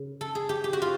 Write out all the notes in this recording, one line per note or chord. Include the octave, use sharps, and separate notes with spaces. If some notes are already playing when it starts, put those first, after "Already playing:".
Already playing: C#3
A4
G#4
G4
G4
F#4
F4